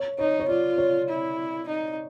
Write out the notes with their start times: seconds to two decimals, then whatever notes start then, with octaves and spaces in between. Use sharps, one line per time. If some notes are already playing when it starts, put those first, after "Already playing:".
Already playing: C#5
0.19 D#4 C#5
0.40 C#5
0.48 F4 D5
0.78 C#5
1.09 E4
1.68 D#4